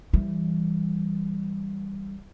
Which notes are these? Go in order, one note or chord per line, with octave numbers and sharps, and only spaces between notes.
E3 G3